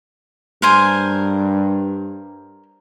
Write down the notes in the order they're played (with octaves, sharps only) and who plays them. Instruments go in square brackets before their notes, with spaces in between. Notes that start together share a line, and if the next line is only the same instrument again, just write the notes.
[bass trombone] G2 [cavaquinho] A#4 C5 G#5